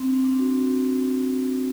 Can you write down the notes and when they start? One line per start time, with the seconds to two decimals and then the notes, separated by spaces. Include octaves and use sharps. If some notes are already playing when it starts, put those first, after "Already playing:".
Already playing: C4
0.08 D4
0.24 D4
0.39 F#4